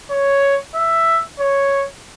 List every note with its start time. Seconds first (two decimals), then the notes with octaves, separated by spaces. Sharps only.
0.11 C#5
0.76 E5
1.40 C#5